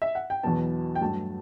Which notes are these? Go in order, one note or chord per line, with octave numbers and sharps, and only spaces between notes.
E5
F#5
G5
E2 B2 F#3 B3 A5
G5
G2 F#3 A3 A5